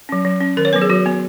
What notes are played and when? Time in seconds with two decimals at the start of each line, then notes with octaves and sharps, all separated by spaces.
0.09 F#3 C#4
0.25 F#3
0.41 C#4
0.57 D#3 A#4
0.65 C#5
0.73 F#3 B3 B4
0.82 G#4
0.90 F#3 F#4
1.06 B3